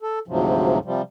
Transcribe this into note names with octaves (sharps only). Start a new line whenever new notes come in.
A4
D2 G#2 C3 F3 F#3
C3 F3 G3